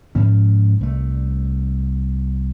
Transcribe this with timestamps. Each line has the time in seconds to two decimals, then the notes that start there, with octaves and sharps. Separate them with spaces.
0.15 G#2 F3 C#4
0.81 C2 A3